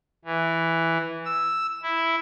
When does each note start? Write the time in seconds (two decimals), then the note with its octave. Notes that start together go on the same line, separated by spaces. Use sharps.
0.25 E3
1.25 E6
1.83 E4